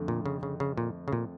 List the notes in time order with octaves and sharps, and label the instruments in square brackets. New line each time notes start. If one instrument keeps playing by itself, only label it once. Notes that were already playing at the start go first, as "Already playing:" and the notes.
Already playing: [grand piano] F2 D3 A3
[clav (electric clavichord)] A#2
C#3
C#3
C#3
A#2
C#3
A#2